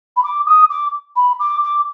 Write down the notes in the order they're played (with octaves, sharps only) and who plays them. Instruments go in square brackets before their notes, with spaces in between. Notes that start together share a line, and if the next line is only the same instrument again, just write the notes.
[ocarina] B5
D6
D#6
D6
B5
D6
D6